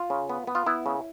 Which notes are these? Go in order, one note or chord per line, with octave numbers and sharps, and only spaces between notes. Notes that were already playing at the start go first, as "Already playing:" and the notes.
Already playing: F4
C#3
B3
B3
F4
B3 E4
C#3